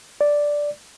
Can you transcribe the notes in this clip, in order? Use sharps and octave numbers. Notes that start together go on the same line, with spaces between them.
D5